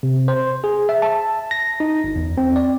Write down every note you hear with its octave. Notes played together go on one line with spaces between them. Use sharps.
C3
C5
G#4
E5
A5
A#6
D#4
G1
E2
C4
D5